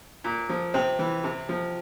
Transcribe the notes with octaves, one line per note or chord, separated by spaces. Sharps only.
A#2
F3
C3 C4
E3
C3
F3